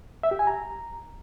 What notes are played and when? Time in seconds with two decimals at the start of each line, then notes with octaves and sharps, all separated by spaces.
0.23 E5
0.31 G4
0.39 G#5
0.47 A#5